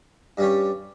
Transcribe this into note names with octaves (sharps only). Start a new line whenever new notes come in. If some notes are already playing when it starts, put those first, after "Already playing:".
G2 G3 C#4 G4 C#5